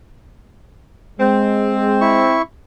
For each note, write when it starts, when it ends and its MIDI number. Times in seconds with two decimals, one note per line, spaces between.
1.20 2.33 56
1.20 2.36 60
2.01 2.42 64
2.01 2.42 85